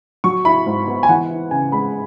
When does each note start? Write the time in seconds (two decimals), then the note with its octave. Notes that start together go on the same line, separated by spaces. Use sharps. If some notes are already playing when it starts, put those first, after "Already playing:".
0.24 F#3 C#6
0.45 E4 B5
0.66 G#2
0.87 B3
1.03 G#5
1.09 E3 F#5
1.30 E4
1.51 C#3 G#5
1.72 G#3 B5